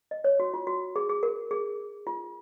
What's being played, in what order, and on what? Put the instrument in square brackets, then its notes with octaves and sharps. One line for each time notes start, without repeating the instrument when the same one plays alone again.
[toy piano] D#5
C#5
F#4
F4
F#4
G#4
G#4
A#4
G#4
F4